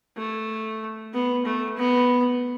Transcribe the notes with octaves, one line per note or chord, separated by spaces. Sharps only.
A3
B3
A3
B3